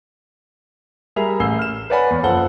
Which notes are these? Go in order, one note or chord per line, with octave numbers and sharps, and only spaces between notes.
G3 G#4 A#4 E5 B5 F7
A1 G#5 E6 C7 G7
F6 E7
B4 C#5 D5 F#5 G#5 B5
E2
F#1 F3 A4 C5 F#5 G7